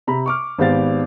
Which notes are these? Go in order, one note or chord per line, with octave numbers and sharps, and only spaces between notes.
C3 A#5 B5
C#6 D6 F6
G#1 B3 G4 C5 F5 A6